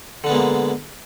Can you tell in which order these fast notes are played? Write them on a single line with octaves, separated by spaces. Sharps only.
D3 D4 B3 G#3 A#3